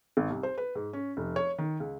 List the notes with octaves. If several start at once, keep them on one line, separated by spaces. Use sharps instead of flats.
G#1
C2
C5
B4
G#2
C#4
F1
C#5
D#3
C#2